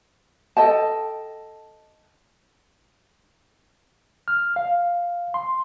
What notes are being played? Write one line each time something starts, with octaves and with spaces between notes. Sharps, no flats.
A4 D#5 G5 A5
F6
F5
C6